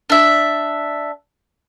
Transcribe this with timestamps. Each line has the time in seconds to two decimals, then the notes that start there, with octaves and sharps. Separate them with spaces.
0.10 D4 E5